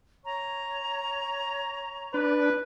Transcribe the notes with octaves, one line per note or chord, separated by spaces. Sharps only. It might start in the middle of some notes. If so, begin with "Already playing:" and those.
C#5 A#5 C#6
D4 B4